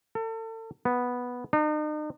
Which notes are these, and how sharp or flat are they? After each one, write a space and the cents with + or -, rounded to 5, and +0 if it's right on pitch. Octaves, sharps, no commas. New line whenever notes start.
A4 +35
B3 -5
D#4 -40